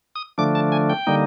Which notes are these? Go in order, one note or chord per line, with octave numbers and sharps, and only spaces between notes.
D#6
D3 F3 A3 D4 D6
A5
G#5
G5
D3 G3 A#3 D#4